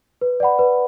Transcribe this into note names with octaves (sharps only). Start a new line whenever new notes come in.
B4
D5 F#5 B5
B4